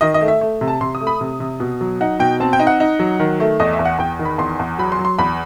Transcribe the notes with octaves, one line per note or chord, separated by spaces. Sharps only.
D#3 D#5
D#5
A3
E5
A3
C3
A5
C3 C6
D#6
A3
B5
C3
C3
B2
F#3
D#4 F#5
B2 G5
C4 A5
G5
D#4
F#5
D#4
F#3
D#3
A3
E2 D#5
E5
E2
F#5
E2 G5
D#3
B5
E2 C6
E2
F#3 B5
C6
F#3
C6
E2 B5